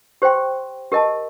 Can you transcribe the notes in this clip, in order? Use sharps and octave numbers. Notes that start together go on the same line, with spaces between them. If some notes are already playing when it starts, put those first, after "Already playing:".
G4 C5 G5 C6
G4 A#4 D#5 A5